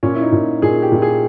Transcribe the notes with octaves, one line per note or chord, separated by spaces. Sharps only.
A#2 C#4
E4
D#4
A#2
A#2 G#4
G4
A#2
G#4